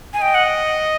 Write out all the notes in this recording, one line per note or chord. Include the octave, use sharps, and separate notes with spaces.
G#5
D#5 G5
F#5